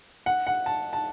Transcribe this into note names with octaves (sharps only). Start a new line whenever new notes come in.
F#5
F#5
A5
A5